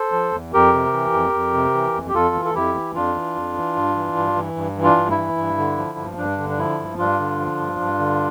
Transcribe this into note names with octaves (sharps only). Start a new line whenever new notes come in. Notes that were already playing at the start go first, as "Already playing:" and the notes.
Already playing: A4 C5
F3
E2
F2 G4 A#4
C3
E3
F2
F2
C3
E3
F2
G4
F2 F4 A4
E3
A4
F2 E4 G4
E3
F2 D4 F4
E3
F2
E3
G2
E3
G2
E3
G2
E3
D4 F4
G2
E4
E3
G2
D3
F3
G2
G2 D4
D3
D4
F3 E4
G2
G2 D4 F4
D3
F3
G2
G2
D3